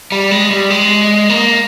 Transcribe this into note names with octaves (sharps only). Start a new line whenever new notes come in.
G3
G#3
G3
G#3
A#3